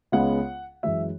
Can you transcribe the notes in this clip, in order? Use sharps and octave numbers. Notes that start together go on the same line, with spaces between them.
C#2 C#3 G#3 B3 F#5
F#2 E3 G#3 E5